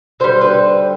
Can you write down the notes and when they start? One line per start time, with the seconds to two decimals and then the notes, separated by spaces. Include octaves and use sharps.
0.20 D3 G3 C5
0.41 B4